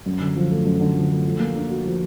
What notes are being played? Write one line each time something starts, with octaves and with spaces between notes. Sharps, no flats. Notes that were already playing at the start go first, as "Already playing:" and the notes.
F#2
D3
F3
A3
F#2
D3
F3
A3
F3
A#3
D4
F#4
F3